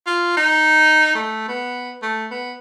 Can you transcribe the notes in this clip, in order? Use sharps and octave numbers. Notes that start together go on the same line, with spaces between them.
F4
D#4
A3
B3
A3
B3